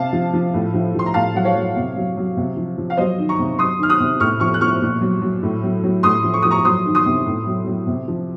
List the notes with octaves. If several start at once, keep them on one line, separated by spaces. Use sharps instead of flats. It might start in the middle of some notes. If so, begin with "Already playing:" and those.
Already playing: C3 F5 A5
F3
F3
A2
F3
F3 C6
A#5
A2 F5 A5
F#3 F#5
C#5 F5
F#3
C3
F#3
F#3
C3
F3
F3
F5
F#3 C5 D#5
D#3
A#5 C#6
C3
F#3 C6 D#6
D#3 F6
D#6 F#6
C3
A2 C#6 F6
F3 C#6 F6
F#6
F3 C#6 F6
A#2
F#3
F#3
A2
F#3
F#3
A2 C6 D#6
F3
C#6
F3 D#6
A#5 C#6
F#3 C6 D#6
D#3
C6 D#6
C3
A2
F#3
F#3
C3
F3